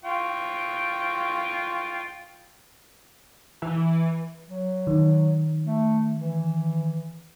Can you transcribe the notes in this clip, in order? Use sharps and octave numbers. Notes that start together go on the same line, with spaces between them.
F4 G5 C#6
E3
F#3
D#3
A3
E3